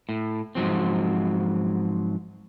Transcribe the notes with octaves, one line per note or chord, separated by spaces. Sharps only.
A2
G#2 F3 F#3 C4